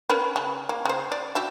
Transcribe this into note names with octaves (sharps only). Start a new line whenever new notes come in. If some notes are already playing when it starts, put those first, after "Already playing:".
C#4 A#4 B4
C#3
A#3
C#3 C5
D5
F#4 G4 E5